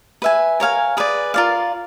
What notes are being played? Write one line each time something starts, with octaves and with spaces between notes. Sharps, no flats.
B4 E5 G#5
A#4 C#5 F5 G#5
G#4 B4 D5
F4 A#4 D5 F5